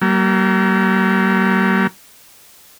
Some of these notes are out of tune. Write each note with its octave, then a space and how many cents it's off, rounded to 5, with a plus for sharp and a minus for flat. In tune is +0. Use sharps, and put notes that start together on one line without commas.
G3 -45 A#3 +0